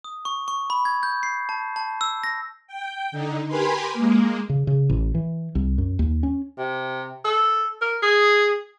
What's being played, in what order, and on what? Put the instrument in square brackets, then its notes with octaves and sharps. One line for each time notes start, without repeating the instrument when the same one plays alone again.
[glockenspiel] D#6
C#6
C#6
B5
G#6
G6
C7
A5
A5
E6
A#6
[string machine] G5
D3 D#4
G4 A#4 B4 G#5 B5 C6
G#3 A#3
[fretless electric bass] C#3
C#3
A1
E3
C2
F#2
D#2
C#4
[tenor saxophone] C3
A4
A#4
G#4